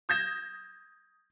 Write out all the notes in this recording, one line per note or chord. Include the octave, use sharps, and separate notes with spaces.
D#6 G6 G#6 A#6 E7